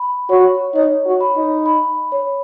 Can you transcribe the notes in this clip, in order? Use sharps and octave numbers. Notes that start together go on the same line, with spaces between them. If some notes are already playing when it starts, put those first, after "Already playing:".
Already playing: B5
F#4 C#5
D#4 C#5
F#4
B5
D#4
B5
C#5